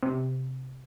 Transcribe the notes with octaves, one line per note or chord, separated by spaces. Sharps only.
C3